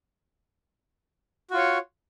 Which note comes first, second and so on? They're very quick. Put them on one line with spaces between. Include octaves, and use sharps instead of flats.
F#4 F4 C#5